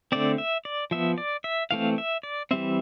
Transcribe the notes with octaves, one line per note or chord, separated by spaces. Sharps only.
D3 A3 C4 D5
E5
D5
F3 B3 E5
D5
E5
E3 A3 C4 F5
E5
D5
E3 G3 C4 E5